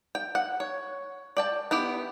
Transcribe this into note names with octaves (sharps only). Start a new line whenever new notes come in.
G5
F#5
C#5
D5 G5 A5
B3 E4 G4